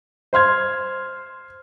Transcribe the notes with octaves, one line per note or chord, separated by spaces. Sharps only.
C5 C6 F6 G#6